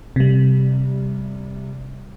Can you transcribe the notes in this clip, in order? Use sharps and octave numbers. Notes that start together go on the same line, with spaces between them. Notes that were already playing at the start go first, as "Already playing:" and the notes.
C3 G3